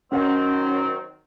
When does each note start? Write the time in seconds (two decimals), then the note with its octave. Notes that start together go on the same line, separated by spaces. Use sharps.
0.12 D#3 F#3 C4 C#4 F#5